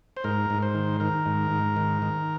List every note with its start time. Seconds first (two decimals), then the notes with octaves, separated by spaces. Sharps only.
0.17 C5
0.24 G#2 A#4
0.50 G#2
0.62 C5
0.75 D#3
1.00 D#3 A#4
1.26 G#2
1.51 G#2
1.76 D#3
2.02 D#3